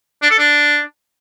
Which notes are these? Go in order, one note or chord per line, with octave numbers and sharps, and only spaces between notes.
D4
A4
D4